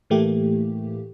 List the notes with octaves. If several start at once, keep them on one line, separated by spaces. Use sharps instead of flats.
A2 E3 A3 A#3 G4